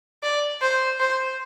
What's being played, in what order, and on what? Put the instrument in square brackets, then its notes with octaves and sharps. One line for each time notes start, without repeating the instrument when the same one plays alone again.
[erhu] D5
C5
C5